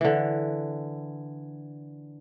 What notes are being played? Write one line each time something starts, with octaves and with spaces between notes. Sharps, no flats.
D3 E3